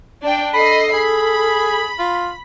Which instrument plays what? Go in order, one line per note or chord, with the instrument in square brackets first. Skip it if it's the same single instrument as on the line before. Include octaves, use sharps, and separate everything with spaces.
[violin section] D4 D5 G5
[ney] A4 [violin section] D#5 C7 [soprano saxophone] B5
[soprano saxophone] G#4 [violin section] B5
[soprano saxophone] F4